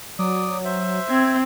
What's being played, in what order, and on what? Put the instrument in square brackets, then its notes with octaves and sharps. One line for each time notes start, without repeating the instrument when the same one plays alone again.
[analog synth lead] F#3 [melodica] D5 D#6
[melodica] C5 E5
[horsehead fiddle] C4 [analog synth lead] G#6